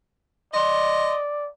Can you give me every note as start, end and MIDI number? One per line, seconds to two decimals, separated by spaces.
0.54 1.49 74
0.54 1.21 75
0.54 1.14 84